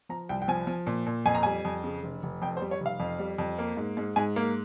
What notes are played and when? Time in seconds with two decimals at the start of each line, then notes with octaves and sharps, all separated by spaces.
0.09 F3 A#5
0.29 C2 G5
0.42 G5
0.48 F3 G#5
0.67 F3
0.87 A#2
1.06 A#2
1.26 F2 G#5
1.35 A#5
1.43 G3 G#5
1.65 F2
1.84 C#3
2.03 F1
2.23 F1
2.42 F2 G5
2.57 C5
2.61 G3
2.71 C#5
2.81 F1
2.86 F5
3.00 F2
3.19 G3
3.38 F2
3.59 A#3
3.77 G#2
3.97 G#2
4.16 G#2 G#5
4.36 A#3